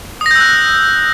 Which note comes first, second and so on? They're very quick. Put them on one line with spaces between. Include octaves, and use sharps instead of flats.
D#6 A#6 G6 E6 F#6